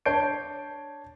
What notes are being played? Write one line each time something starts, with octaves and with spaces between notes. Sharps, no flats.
D4 C#5 A5 G6 C7 D7